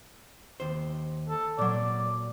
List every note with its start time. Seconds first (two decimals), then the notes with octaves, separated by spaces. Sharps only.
0.60 D#2 C5
1.29 A4
1.59 A#2 F#3 D5